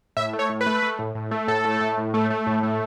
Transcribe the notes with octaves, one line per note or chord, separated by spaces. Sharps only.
A2 E5
A3
C#5
A2
B4
A3
A3
A2
A2
A3
A2 A4
A3
A2
A2
A3
A3
A2
A3